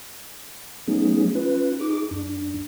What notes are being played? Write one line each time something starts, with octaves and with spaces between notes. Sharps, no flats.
F#3 A3 B3 C#4 D#4 G#4
C#4 F4 B4
D#4 G#4 D6
F#2 D4